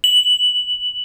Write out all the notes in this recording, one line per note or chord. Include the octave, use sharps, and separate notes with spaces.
F#7